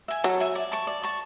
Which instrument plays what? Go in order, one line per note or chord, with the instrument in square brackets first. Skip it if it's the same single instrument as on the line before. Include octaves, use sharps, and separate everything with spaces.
[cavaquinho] E5 G#5
[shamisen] F#3 [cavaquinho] A4
[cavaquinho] E5 G#5
D5
A5 C#6
D5
A5 C#6